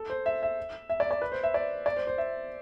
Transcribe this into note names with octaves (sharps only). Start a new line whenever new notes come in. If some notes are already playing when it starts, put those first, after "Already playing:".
Already playing: A4
C5
E5
E5
E5
D5
D5
B4
C5
E5
D5
D5
C5
C5
E5